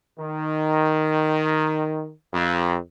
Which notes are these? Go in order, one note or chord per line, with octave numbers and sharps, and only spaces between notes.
D#3
F2